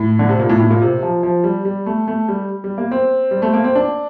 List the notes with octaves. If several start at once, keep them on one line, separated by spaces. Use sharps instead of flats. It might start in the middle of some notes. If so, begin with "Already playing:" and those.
Already playing: A2
D3
C3
A#2
A2
A2
A#2
C3
F3
F3
G3
G3
A3
A3
G3
G3
A#3
C4
G3
A3
A#3
C4
D4